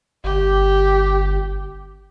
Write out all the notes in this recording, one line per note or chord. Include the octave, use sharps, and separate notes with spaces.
G1 G4